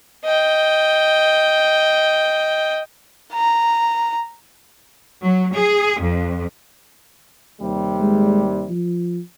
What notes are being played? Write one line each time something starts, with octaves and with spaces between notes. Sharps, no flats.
D#5 G5
A#5
F#3
G#4
F2
D#2 C3 G3
G#3
F3